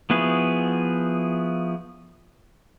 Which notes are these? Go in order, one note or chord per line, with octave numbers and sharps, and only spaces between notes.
F3 B3 E4 F#4 G#4